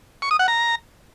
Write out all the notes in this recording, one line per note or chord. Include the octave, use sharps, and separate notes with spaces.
C#6
D#6
F#5
A#5